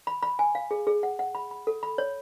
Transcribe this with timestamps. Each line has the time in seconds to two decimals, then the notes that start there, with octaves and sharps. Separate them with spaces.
0.07 B5
0.23 B5
0.39 G#5
0.55 F5
0.71 G#4
0.87 G#4
1.03 F#5
1.19 F#5
1.35 B5
1.51 B5
1.67 A4
1.83 B5
1.98 C#5